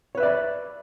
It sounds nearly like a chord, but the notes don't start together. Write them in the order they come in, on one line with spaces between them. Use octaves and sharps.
C#5 B4 E5 D5 B5